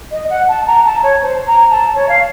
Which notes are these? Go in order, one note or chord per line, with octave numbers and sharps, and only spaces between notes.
D#5
F#5
A5
A#5
A5
C#5
C5
A#5
A5
C#5
F5